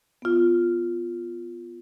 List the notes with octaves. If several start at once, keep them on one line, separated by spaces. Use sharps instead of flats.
B3 F4